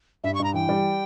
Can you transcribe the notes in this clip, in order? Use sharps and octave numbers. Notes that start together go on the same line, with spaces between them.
G2 E5
C#6
G2 A#5
E3 G5
G3